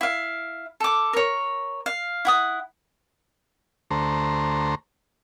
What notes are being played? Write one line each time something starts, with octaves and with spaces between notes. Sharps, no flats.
E4 F5
A4 D6
A#4 C#5
F5
E4 F#5 D#6
D2 A3 C5 A#5